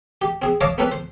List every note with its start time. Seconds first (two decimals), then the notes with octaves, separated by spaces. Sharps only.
0.21 G4
0.42 C4 G#4
0.61 C#5 D#5 F5 A5 D6
0.78 A#3 C4 C#4 F4 A4 B4
0.92 C5